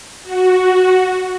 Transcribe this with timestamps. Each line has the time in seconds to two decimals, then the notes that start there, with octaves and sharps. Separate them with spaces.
0.24 F#4